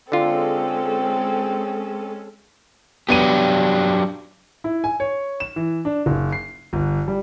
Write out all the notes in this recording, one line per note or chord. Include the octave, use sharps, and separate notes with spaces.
D3 G#3 C4 C#4 F4 A4
F#3 B3 D4 G4 D#7
E4
G#5
C#5
E7
E3
D4
F#1
C7
G1
G3